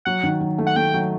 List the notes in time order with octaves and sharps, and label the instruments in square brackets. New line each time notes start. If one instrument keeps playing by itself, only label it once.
[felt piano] F#3 [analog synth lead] F#5
[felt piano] D#3
F#3
A3
[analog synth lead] F#5
[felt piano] A3 [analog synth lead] G5
[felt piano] F#3